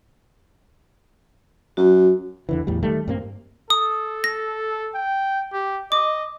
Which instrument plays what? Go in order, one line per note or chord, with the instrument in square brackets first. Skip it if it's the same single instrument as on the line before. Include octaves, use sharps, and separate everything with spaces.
[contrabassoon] F#2 [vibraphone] F#4
[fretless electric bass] E2 D3 E3
E2 A2 G3
D#3 G3 A3
G2 G3 A#3 C4
[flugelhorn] A4 [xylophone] D#6
[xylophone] A#6
[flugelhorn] G5
G4
[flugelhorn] D#5 [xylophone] D6